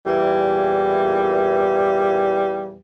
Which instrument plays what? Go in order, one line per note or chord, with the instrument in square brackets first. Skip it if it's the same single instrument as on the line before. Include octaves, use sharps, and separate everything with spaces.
[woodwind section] E2 A#2 E3 [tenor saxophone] G3